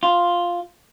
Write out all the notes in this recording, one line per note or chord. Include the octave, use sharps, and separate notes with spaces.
F4